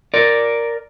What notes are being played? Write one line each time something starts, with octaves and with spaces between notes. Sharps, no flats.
A#4 D5